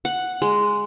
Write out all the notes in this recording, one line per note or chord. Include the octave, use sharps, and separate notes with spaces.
F#5
G#3